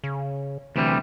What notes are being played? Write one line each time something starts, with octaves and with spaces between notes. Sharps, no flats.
C#3
D2 C3 E3 G3